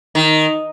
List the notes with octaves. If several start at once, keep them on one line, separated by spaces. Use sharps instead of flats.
D#3